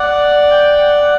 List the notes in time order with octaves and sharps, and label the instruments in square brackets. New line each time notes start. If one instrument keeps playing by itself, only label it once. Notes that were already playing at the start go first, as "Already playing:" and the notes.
Already playing: [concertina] D5 [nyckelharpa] F#5
[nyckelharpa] G5
F#5